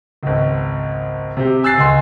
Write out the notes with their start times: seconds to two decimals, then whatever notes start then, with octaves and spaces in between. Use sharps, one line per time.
0.23 G#1 C#2
1.37 C3 G4
1.64 G#5 E6 F#6 A6 C7
1.78 C#2 G#5 C6